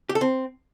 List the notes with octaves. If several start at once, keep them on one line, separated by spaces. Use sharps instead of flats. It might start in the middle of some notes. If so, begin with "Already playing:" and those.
G4
A4
C4